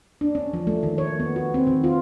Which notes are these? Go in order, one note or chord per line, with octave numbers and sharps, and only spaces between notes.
D4
C#4
F3
A3
D#3
C#5
B3
F#4
C4
D#3
F4